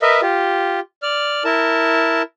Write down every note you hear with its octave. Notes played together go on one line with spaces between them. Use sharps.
A#4 B4 D#5 E5
F4 G4
D5 F6
E4 A#4 A5